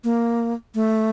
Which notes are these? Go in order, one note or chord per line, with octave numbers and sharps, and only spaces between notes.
A#3
A3